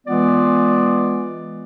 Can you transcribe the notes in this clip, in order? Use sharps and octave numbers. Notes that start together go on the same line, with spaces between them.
E3 G#3 B3 F4 D5